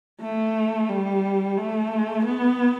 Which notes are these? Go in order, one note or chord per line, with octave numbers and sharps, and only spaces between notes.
A3
G3
A3
B3